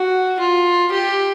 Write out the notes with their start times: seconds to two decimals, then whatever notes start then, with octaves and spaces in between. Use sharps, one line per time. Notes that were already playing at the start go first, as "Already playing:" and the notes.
Already playing: F#4
0.40 F4
0.92 G4